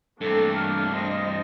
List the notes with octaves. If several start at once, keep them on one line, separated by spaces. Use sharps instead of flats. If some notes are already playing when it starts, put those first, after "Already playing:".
G2 A3 A#3 C4 D4 A4
F6
C5 D#5 A#6